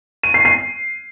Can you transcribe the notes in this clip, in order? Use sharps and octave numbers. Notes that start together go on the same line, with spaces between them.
D#7
C7
C7